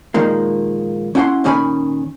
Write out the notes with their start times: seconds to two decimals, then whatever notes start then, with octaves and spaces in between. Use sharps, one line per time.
0.14 A#2 D#3 F3 G#3 A#3
1.15 C#4 E4 F#5 G5 C6
1.44 A#2 D#3 C#4 G#5 B5